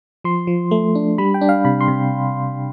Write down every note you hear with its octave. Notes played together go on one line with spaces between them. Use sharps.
F3 C6
F3
A3
D4
G3 B5
G5
D4
F5
C3 B5
C6
C3